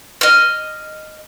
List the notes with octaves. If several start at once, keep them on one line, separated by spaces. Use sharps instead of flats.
D#5 F6